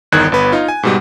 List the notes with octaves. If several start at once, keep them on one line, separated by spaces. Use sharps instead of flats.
G1 E2 D#3 F#6 G#6
G1 B3 B4
D#4 F4
G#5
G#2 B2 G3